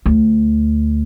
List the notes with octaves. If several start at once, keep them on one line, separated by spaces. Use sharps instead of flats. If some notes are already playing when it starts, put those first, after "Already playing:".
D2